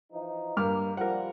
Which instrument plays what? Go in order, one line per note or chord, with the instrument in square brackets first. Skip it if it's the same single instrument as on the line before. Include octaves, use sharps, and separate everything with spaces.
[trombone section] E3 F3 D#4
[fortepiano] G2 D6 F6 [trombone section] A#3
[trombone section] F3 G3 [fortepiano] A#4 F#5